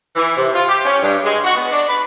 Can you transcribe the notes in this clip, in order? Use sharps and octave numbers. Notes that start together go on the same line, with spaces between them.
E3
C3
F4
G4
C#4
G2
G#3
F#4
B3
D4
B4